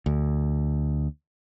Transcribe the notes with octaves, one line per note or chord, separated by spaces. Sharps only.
D2